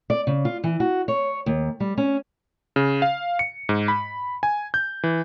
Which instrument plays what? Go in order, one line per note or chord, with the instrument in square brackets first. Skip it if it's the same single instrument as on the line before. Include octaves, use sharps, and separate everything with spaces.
[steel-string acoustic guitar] D5
C#3
F4
E3
F#4
C#5
D#2
G3
C#4
[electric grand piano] C#3
F5
C#7
G#2
B5
G#5
G6
E3